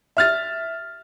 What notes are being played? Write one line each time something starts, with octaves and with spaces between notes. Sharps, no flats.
E5 F6 A6